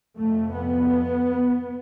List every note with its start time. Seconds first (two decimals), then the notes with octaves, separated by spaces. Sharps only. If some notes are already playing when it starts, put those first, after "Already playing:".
0.18 F2 C3 A3
0.56 B3